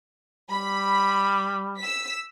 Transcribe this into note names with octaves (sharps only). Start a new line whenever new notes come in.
G3 B5
E6 B6